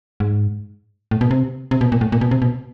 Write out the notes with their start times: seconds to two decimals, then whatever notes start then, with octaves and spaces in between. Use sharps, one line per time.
0.20 G#2
1.11 A2
1.21 B2
1.31 C3
1.71 C3
1.81 B2
1.92 A#2
2.01 A2
2.12 A#2
2.21 B2
2.31 C3
2.42 B2